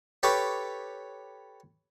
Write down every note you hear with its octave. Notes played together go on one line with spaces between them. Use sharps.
G4 A4 B4 C#5 C#6 D6